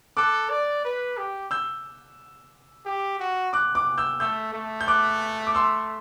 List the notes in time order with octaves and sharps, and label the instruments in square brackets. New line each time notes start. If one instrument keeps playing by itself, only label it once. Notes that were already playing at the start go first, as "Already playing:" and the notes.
[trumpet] A4 [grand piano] D6 F#6
[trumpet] D5
B4
G4
[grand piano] E6 G6
[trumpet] G4
F#4
[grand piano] D6 F#6
D6 F#6
E6 G6
[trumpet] A3 [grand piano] E6 G6
[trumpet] A3
[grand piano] G6
D6 F#6
D6
C6 E6